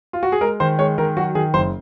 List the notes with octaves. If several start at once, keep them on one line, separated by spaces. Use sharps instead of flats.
F4
F#4
G#4
G#3 A#4
D#3 C5
G#3 C#5
D#3 A#4
F#3 F#4
D#3 G#4
F#1 C5